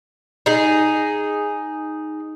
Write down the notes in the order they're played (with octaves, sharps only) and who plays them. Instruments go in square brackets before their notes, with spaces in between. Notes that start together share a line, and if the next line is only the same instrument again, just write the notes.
[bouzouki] D#4 G#4